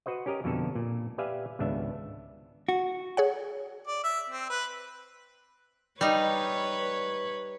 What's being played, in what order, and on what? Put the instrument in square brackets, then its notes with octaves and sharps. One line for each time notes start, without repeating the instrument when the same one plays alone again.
[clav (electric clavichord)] F#4 B4 C5 D#5
C#4 G4 A#4 D#5
F2 B2 D3 A#3 A4
A#2
G4 B4 D5 E5 F5 G#5
G#1 C#2 B3 D4 E5
[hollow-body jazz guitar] F#4
[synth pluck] G#4 C#5 F#5
[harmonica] D5
E5
C4
B4
[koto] G3 D#4 [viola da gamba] B4 C#5